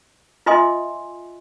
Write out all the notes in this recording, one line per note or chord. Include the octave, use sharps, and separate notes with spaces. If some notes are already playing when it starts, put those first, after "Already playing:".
F4 D#5 E5 G#5 C6 D#6